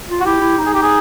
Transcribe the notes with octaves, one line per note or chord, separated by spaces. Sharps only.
F4
F#4
E4 G4
E4
D#4
G#4
G4
G#4